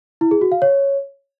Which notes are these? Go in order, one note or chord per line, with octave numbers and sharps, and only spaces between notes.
E4
G#4
F#4
F5
C#5